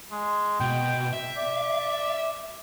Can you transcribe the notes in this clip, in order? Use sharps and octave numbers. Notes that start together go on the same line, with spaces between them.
G#3
B2 G5
E5
D5